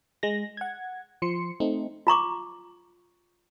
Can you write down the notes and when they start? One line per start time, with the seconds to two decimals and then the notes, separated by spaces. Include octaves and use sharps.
0.23 G#3 A#6
0.57 F#5 G#6
1.22 F3 C6 C#7
1.60 A3 C4 D#4
2.07 F4 A#5 C#6 D6